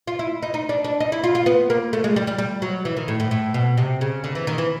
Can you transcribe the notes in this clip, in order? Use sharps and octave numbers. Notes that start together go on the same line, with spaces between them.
F4
E4
D#4
D#4
D4
D4
D#4
E4
F4
F4
B3
A#3
A3
G#3
G3
G3
G3
F#3
E3
D#3
A2
A2
A2
B2
C3
C#3
D3
E3
D#3
E3